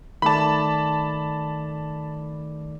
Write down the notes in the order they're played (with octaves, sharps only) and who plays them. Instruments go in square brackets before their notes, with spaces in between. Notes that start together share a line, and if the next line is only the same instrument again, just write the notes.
[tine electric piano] D#3 A3 D5 [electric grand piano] A5 B5